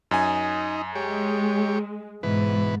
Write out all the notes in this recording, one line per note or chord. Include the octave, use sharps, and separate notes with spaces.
F#2 D#4 G#5
G#3 G4 C#5
G#2 B2 E3 B4